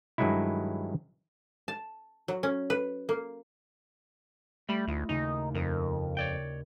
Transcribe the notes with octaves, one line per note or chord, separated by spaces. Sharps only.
G2 D#3 F#3 G#3 D#4 E4
A5
F#3
C#4
B4
A#3
G3 A3 B5
D2 E4 F4 D#5
D#2 C#3 D#4
F2 A#4 D#5 A#5
C#5 D5 G5